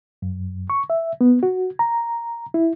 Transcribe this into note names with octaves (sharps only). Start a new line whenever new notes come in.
F#2
C#6
E5
B3
F#4
A#5
E4